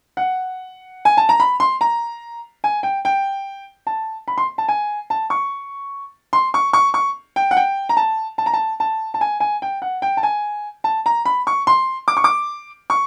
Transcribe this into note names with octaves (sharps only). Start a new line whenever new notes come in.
F#5
G#5
A5
A#5
B5
C6
A#5
G#5
G5
G5
A5
B5
C6
A5
G#5
A5
C#6
C6
C#6
C#6
C#6
G5
F#5
G5
A#5
A5
A5
A#5
A5
A5
A5
G#5
G#5
G5
F#5
G5
A5
G#5
A5
A#5
B5
C#6
C6
D6
C#6
D6
C#6